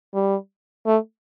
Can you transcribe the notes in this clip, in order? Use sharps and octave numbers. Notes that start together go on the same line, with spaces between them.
G3
A3